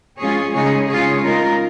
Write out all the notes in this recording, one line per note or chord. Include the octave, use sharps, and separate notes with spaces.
F3 G#3 C#4 F4 G#4 C#5
C#3 G#3 D#4 G#4 C#5
C#3 G#3 C#4 F4 G#4 C#5
C#3 G#3 D#4 F4 A#4